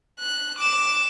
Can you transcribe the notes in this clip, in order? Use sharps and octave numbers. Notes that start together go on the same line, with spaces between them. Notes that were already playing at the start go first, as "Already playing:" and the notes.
F#6
D6 E7